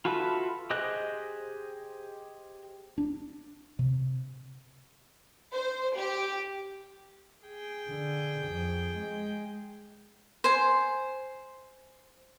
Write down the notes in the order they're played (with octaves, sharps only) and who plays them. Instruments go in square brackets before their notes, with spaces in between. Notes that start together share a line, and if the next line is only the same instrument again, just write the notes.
[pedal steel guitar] F4 F#4 A4 B4 E5
G4 G#4 C5 D#5 F#6
[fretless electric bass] D4
C3
[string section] C5
G4
[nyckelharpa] G#4 G5
[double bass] D3
F2
G#3
[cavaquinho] C5 G#5